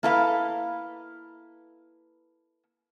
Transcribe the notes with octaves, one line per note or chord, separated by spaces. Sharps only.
A#3 E4 A4 B4 D#5 F5